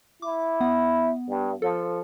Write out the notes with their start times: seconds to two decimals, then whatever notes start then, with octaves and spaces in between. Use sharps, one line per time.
0.22 E4 D6
0.60 B3 F#5
1.29 G2
1.62 F3 A4